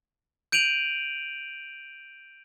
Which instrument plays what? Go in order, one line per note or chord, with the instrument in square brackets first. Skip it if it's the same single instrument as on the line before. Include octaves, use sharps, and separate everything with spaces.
[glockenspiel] G6 D7 D#7 F7 F#7